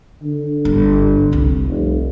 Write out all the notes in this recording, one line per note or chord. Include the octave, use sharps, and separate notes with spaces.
D3
G1
C2 F4
F1